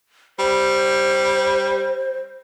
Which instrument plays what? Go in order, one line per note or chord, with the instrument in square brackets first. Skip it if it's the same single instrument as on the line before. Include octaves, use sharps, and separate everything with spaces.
[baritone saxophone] G3 [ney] C5